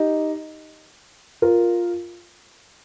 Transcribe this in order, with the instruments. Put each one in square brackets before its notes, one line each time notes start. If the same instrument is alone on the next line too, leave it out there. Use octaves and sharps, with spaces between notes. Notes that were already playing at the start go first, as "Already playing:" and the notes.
Already playing: [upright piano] D#4 G4
F4 A#4